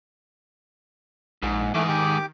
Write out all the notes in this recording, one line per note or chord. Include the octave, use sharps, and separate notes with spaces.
A#1 G#2
G#2 E3 A3 G#4 D6
D#3 G4 D6